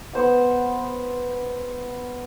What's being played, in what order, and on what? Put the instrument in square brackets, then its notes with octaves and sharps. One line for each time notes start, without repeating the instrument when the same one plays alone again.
[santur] B3 C5 F#5